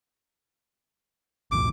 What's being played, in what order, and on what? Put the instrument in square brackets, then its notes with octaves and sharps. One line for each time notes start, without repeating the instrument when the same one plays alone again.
[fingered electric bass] B1 E2 A2 [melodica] D6